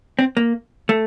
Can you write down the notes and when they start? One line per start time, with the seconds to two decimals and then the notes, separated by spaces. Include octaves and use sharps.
0.19 C4
0.37 A#3
0.89 A3